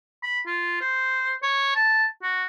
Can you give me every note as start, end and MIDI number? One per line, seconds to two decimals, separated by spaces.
0.23 0.39 83
0.46 0.77 65
0.81 1.36 72
1.43 1.75 73
1.76 2.06 81
2.23 2.46 66